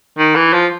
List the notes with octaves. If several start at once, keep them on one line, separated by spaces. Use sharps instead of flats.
D#3
E3
F3